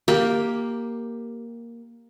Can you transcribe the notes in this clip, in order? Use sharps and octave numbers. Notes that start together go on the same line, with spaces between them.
A#3 G4